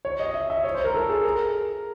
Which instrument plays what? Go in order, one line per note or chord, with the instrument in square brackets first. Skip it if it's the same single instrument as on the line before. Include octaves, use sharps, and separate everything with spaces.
[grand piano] C#5
D#5
E5
E5
C#5
C5
A#4
A4
G#4
A#4